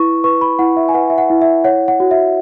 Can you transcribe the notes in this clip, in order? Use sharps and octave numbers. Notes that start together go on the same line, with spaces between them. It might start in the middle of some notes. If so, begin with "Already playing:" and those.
Already playing: E4 B4 C#6
B4 C#6
B5
E4 F#5
E5
G#5
B4 F#5
E5
F#5
E4
E5
C#5 F#5
F#5
F#4
E5